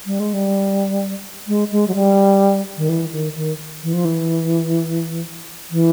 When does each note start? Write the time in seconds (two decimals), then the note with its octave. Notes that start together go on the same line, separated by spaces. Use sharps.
0.06 G3
0.20 G#3
0.33 G3
1.48 G#3
1.71 G#3
1.88 F#3
1.95 G3
2.77 D#3
2.89 E3
3.12 D#3
3.36 D#3
3.83 E3
3.93 F3
4.05 E3
5.71 E3